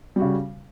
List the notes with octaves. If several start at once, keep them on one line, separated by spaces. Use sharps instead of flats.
C#3 G3 F#4